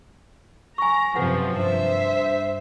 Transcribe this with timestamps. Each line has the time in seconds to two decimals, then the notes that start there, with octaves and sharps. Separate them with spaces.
0.78 G#5 A#5 C#6
1.15 F#2 C3 F3 B4 F#5
1.54 G2 C5 E5